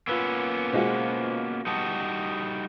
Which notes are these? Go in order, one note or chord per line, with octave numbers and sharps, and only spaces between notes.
A#3 B3 C#4 F4 B4 E6
B2 G#3 F4 C5 F#5
G3 D#4 F#4 A5 D#6